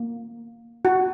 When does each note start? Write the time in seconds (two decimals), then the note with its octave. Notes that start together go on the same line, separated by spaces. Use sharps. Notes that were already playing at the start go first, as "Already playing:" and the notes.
Already playing: A#3
0.85 F#4